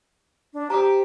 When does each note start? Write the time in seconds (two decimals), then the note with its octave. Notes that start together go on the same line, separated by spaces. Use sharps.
0.53 D4
0.70 G4 C5 A#5 D#6